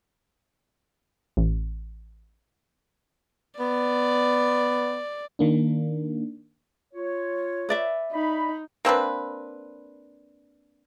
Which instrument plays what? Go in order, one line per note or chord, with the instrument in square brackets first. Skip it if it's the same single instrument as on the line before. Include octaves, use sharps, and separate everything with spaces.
[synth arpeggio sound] A1
[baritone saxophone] B3 [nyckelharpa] D5
[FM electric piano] D#3 A#3 D4
[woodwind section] F4 C#5
[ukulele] B4 D5 E5
[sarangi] D#4 [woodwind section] B5
[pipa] A#3 C4 D4 B4